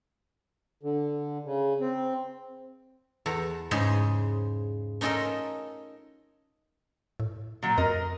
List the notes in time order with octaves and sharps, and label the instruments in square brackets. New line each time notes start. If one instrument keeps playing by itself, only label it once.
[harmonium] D3
C#3
C4
[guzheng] E2 A4 A#5
G#2 C#3 G#3 G#4 C5 G#5
C#4 D#4 F4 A4 A#4 D#5
[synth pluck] A2
[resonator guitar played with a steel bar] A#2 F#3
[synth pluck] F2 [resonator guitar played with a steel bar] A#4 D#5